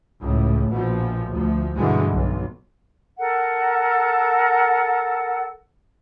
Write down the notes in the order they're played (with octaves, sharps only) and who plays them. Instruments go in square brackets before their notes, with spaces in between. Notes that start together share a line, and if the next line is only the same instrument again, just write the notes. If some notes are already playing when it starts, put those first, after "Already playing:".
[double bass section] C#2 A2
A#1 B2 F3
D2 F3
G2 B2 D3 E3 G3 G#3
B1
[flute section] A4 A#4 F#5